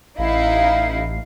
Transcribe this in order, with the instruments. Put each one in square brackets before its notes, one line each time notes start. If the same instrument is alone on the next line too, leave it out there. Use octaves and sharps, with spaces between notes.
[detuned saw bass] A1 [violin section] D#4 E4 [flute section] F5